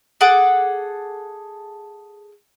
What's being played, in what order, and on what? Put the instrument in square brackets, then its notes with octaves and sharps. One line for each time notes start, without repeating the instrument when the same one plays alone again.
[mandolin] G#4 A4 F#5 D6